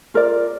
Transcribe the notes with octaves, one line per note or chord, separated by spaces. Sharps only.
F4 A#4 D5